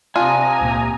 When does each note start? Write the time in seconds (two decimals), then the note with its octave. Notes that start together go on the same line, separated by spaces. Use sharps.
0.16 C3 D4 F4 G#5 A#5 D#6
0.61 C#2 A#2 A#3